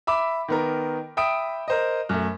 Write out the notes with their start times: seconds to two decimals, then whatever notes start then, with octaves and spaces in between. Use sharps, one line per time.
0.07 E5 B5 D6
0.48 D#3 B3 A#4
1.17 E5 G5 B5 D#6 D7
1.68 A#4 C5 D#5
2.09 F#2 A3